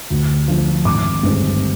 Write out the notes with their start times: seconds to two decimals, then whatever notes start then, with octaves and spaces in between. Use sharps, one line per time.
0.10 D2
0.48 D3 F3
0.85 G#1 D6
1.23 G2 D3 G#3 C4